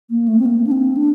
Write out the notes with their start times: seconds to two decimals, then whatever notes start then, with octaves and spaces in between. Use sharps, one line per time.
0.10 A#3
0.28 A3
0.39 C4
0.46 A#3
0.67 D4
0.72 C4
0.97 D4